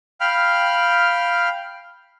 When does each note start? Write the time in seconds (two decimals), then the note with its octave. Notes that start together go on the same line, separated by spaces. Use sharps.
0.21 F5 G5 B5 F6